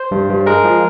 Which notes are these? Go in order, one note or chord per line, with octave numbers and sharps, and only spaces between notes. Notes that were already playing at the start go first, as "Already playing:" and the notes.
Already playing: C5
G2
G2
G#3 A#4
F3